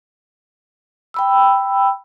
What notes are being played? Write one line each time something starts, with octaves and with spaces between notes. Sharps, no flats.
G5 B5 E6